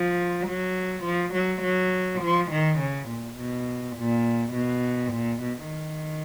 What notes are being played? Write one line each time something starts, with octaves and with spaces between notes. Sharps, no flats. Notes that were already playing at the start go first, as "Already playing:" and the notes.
Already playing: F3
F#3
F3
F#3
F#3
F3
D#3
C#3
A#2
B2
A#2
B2
A#2
B2
D#3